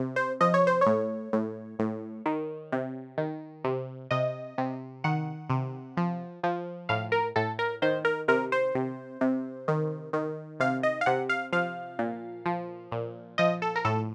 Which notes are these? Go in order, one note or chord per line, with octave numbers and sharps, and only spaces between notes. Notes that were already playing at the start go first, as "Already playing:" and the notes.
Already playing: C3
C5
F3 D#5
C#5
C5
A2 C#5
A2
A2
D#3
C3
D#3
C3
C3 D#5
C3
D#3 F#5
C3
F3
F3
A2 F5
A#4
A2 A4
A#4
D#3 C5
A#4
C3 A#4
C5
C3
C3
D#3
D#3
C3 F5
D#5
F5
C3 F#5
F5
F3 F5
A#2
F3
A#2
F3 D#5
A4
A#4
A2 A4